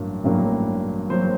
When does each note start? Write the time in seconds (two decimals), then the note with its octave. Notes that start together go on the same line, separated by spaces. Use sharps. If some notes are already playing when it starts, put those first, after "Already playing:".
Already playing: A1 G2 F#3 A#3
0.24 A1 G2 F#3 A#3
1.10 F#3 A#3 C5